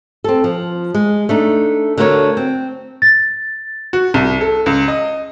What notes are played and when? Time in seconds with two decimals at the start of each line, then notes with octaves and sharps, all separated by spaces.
0.24 C4 A4
0.44 F3
0.94 G#3
1.29 A3 D4 D#4
1.98 D3 A3 F#4 A#4 C5 C#5
2.37 C4
3.02 A6
3.93 F#4
4.14 C2
4.41 A4
4.66 C#2
4.88 D#5